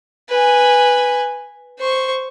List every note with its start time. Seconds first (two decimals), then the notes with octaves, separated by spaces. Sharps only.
0.29 B4 G#5
1.80 C5 C#6